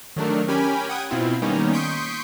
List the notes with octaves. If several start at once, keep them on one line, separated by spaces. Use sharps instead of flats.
D#3 F#3 A3 D4 A#4
C#4 G4 A#4 G#5 B5
F#5 G5 D#6 G#6
B2 C4 E4 F4
D#3 G3 A#3 B3 C#4 D#4
C6 C#6 D#6 G6 B6 D7